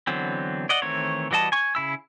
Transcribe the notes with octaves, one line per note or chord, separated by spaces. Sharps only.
D3 E3 F#3 B3 C4
D5 D#5 F#5
D#3 E3 A3 C4 C#5
E3 G3 F#4 D#5 A5
G#5 C#6
C#3 E4 E6